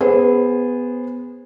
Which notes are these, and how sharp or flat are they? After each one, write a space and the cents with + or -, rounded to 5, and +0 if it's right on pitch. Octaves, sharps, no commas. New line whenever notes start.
B3 +5 G#4 -20 C5 +5